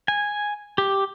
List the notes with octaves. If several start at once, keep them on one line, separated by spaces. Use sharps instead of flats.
G#5
G4